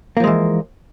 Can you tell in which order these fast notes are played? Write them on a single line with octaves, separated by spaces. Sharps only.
A#3 F3 G#3 E3